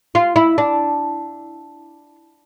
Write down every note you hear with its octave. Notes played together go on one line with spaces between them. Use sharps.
F4
E4
D4